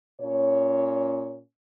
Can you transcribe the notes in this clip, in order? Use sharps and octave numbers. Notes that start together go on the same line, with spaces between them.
A#2 C#4 C#5